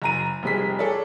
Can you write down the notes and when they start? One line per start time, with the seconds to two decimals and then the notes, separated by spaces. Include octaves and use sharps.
0.02 F#1 A#5 D#7
0.43 F1 F2 G3 G#4 B6
0.79 G#4 A4 C#5 D5